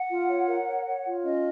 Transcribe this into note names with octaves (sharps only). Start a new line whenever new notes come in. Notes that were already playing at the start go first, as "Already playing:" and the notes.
Already playing: F#5
F4
C#5
A#4
C#5
C#5
F4
C#4 D#5